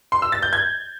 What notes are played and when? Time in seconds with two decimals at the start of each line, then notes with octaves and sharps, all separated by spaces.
0.12 C6
0.22 E6
0.32 A6
0.43 G6
0.53 G#6